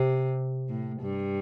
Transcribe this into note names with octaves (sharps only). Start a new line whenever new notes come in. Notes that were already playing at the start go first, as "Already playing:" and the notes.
Already playing: C3
A2
G2